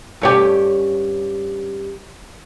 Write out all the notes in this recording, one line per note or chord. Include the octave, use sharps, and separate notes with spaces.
G2 C#4 G4